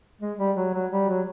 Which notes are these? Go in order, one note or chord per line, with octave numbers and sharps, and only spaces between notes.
G#3
G3
F#3
F#3
G3
F#3